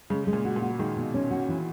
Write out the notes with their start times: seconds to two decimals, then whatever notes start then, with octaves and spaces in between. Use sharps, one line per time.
0.10 C#3 G#3
0.27 G#3
0.33 A#2
0.45 F#4
0.56 A#2
0.62 F#4
0.79 D#3 G#3
0.96 B2
1.14 C#4
1.31 F#4
1.49 E3